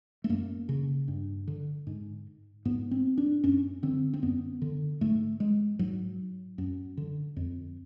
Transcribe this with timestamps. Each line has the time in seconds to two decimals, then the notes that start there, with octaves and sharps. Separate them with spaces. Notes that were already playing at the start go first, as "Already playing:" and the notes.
0.24 A3
0.29 F#2 A#3
0.69 C#3
1.08 G2
1.47 D3
1.87 G#2
2.65 G#2 B3
2.91 C4
3.18 D4
3.44 F#2 C#4
3.83 D3 C4
4.14 C4
4.23 F#2 B3
4.62 D3
5.01 G#2 A3
5.40 G#3
5.79 G#2 F#3
6.58 F#2
6.97 D3
7.37 F2